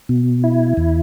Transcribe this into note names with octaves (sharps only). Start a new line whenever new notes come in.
B2
E4
E2